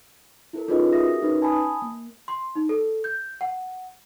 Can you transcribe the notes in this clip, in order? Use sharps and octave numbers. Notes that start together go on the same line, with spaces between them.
E4 A4 A#4
C#4 D#4 F4 G#4 B4 D#5
F#4 G#4 A#4 E5 D#6 A#6
C#4 D#4 B4
G#5 A5 B5 D#6
A#3
C6
D#4
A4
G6
F#5